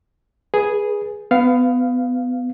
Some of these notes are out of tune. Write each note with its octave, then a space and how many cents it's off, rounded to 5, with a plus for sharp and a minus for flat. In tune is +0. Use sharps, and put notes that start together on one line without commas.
G#4 +0 B4 -25
B3 +25 F5 +0